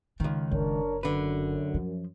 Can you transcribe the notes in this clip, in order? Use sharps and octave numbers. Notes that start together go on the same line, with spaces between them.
C#2 D#3 C#4
F#1 D4 A#4 C#5
F#2 D3 B4
F3